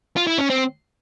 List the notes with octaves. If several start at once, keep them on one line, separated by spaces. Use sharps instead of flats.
F4
E4
C#4
C4